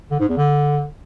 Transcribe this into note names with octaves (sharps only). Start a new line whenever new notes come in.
D3
G#2
E2
D3